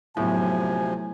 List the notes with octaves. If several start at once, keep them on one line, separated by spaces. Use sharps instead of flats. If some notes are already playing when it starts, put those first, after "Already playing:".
D2 A2 C3 F3 F#3 B3 G#5